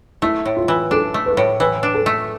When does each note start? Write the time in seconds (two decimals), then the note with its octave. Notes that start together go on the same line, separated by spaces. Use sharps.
0.22 A3 E4
0.45 A2
0.57 F4
0.68 E3
0.91 D4 A4
1.14 A3
1.26 B4
1.37 A2
1.60 E3 B4
1.83 D4
1.94 A4
2.06 A3